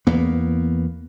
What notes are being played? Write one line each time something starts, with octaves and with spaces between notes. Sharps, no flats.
E2 A#3 B3